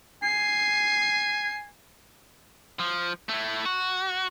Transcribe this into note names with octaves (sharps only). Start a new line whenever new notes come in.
G#5 C7
F3
A3 E4
F#4